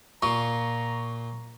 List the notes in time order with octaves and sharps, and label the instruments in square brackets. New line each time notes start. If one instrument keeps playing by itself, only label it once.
[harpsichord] A#2 F4 [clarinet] A#5 [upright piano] C#6